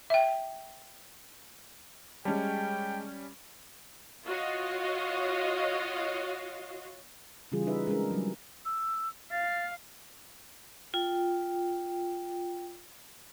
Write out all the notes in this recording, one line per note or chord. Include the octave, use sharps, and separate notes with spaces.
E5 G5
G3 G#3 C#4 G5 A5
F4 F#4 C#5 D#5 F5
C#3 E3 G3 F4 G#4
D#4 B4 E5
G#3 C#4 D4 A#4
F#3 G3
E6
F5 A6
F4 G5